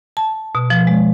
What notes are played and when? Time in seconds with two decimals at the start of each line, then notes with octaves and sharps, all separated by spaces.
0.17 A5
0.55 B2
0.70 F3
0.87 G#3